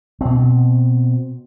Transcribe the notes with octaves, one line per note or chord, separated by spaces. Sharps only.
B2 C4